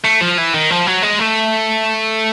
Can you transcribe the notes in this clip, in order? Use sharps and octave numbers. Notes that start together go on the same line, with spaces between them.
A3
F3
E3
D#3
F3
F#3
G#3
A3